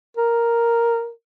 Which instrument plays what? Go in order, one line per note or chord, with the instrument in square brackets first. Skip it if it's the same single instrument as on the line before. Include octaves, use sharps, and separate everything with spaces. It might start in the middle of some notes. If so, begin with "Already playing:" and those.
[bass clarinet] A#4